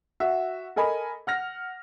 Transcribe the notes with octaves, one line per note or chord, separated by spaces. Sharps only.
F#4 E5
A4 A#4 D#5 G#5 B5
F#5 F6 A#6